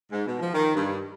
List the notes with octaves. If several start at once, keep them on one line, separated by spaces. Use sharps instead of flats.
G#2
B2
F3
D#3
G2